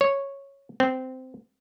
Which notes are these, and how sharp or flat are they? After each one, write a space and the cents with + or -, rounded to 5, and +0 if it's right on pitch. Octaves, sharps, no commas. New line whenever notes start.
C#5 -5
C4 -15